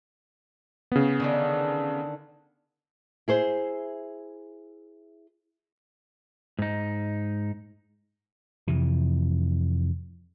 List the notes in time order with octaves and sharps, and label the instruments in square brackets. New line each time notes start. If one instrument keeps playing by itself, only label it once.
[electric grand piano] C#3 B3
[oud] D3 D#3 D4
[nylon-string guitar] E4 G#4 C5
[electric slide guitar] G#2 D#4
[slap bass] F2 C3 E3